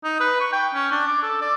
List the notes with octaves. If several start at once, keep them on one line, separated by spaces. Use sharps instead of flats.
D#4
B4
C#6
G5
C#4
D4
D6
A4
D5